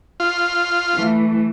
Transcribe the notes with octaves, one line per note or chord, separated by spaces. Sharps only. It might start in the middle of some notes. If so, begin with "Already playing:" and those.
F4
E3 A3